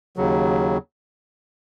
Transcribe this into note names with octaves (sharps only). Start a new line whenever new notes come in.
D#2 C#3 F#3